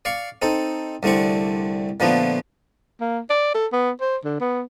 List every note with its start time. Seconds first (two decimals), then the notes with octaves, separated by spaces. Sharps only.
0.05 D5 F5 C#6
0.42 C4 D#4 A4
1.03 C2 D3 A3 C4 C#6
2.00 A#2 D3 F3 A3 B3
3.00 A#3
3.30 D5
3.54 A4
3.72 B3
4.01 C5
4.25 D3
4.40 B3